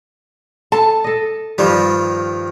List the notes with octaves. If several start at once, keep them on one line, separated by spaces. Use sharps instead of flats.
A4 A5
A4 D#5
G2 D#3 F3 G3